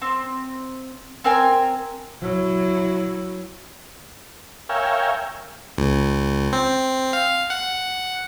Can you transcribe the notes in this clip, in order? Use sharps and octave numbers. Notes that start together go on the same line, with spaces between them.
C4
C4 A#4 G5 G#5
F#3 E4
A#4 C#5 E5 F5 G5 G#5
C#2
C4
F5
F#5